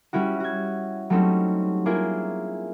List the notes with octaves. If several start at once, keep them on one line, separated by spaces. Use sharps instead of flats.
G3 C#4 E4 F#4
F#4 G#6
F#3 G3 A3 C4 C#4 D#4
A#3 E4 F4 G#4